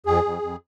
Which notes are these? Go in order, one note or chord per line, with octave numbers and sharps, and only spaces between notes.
F2 G#4
F2
F2